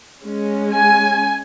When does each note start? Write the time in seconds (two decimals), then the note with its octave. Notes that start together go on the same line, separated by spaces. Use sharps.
0.25 G#3 C#4
0.74 G#5